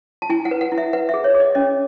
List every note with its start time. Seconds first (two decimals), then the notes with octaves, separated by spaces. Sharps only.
0.22 A5
0.30 E4 G#5
0.45 F#5
0.51 B4
0.61 F#5
0.72 E4
0.78 E5
0.93 B4 F#5
1.09 G#4 E5
1.24 C#5
1.34 G#4
1.40 D#5
1.55 C#4 D#5